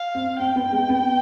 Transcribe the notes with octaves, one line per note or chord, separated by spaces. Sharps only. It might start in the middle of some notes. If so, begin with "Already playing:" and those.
Already playing: F5
C4
C4 G5
B3
G#3
B3